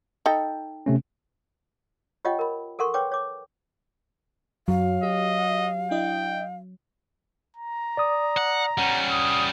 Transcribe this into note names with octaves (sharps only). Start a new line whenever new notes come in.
D#4 A4 G5
C3 A3 C#4
F4 G4 C#5 D#5 F#5 G5
A#4 B5
A4 A#4 F#5 C6 C#6
B4 C#5 G5 D6
C#5 D6
F#2 F#3 F5
G4 D#5
D4 E4 D#5 G5
A#5
D5 D#6
F#5
G3 C#4 F#5
D#6